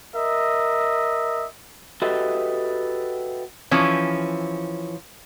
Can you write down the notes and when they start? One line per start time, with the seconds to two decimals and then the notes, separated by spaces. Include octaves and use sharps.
0.15 A#4 D#5 E5
2.02 F#4 G4 A4 B4 D#5 E5
3.71 E3 F3 C#4